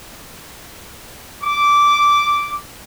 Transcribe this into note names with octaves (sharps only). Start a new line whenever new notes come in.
D6